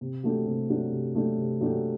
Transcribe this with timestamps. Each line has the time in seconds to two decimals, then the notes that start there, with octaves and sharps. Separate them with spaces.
0.01 C3
0.23 F#3 A3 D4 G4
0.46 C3
0.69 F#3 A3 D4 G4
0.92 C3
1.15 F#3 A3 D4 G4
1.38 C3
1.61 F#3 A3 D4 G4